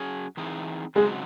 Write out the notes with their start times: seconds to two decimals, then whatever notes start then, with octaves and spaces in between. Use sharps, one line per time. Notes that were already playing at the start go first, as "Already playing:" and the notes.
Already playing: F#3 C#4 G#4
0.37 E3 C4 D#4 G#4
0.95 C#3 F#3 G#3 C4 D#4 F#4